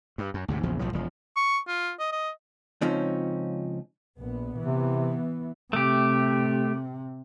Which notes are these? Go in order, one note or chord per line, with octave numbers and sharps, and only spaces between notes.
G2
F#2
D2 G#2 C3
A#1 E2 C#3 F3
B1 A2 F3 F#3
E1 F3
C#6
F4
D#5
D#5
C#2 F3 C4 C#4 D#4 F4
A#1 B3
C3 E3 B3
C3 A3 G4